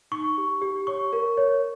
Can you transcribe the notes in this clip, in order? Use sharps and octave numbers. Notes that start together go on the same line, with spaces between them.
D#4 C#6
G4
G4
C#5 C#6
A#4
C#5